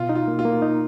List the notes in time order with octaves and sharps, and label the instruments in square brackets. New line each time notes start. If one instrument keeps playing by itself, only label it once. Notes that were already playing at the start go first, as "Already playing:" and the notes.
Already playing: [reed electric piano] B2 [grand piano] F4
[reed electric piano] D#4
[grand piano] F4
[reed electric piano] A#3
[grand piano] F4
[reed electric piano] A#3
D#4